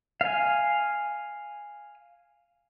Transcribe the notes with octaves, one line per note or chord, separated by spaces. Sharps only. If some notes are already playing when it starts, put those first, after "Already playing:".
F5 G#5